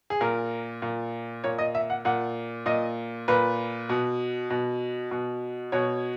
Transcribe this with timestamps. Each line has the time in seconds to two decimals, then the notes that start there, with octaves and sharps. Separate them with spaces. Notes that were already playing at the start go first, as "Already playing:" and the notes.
0.10 G#4
0.21 A#2 A#4
0.82 A#2
1.44 A#2 C#5
1.58 D#5
1.75 E5
1.90 F#5
2.05 A#2 F#5
2.66 A#2 D#5
3.28 A#2 B4
3.89 B2
4.50 B2
5.11 B2
5.72 B2 C#5